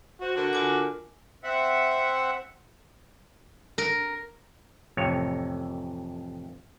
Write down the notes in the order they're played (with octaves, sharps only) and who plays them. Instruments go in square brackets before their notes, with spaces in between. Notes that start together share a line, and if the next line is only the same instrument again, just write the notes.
[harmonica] F#4 [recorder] C5
[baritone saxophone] D3 [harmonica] F#4 [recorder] A#4
[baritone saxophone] D3 [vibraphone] F4 G#5 D6
[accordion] C4 E5 F#5
[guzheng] A#4
[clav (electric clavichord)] A1 F2 C3 C#5